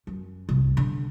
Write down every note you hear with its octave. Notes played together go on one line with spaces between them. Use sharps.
F#2
C2
D3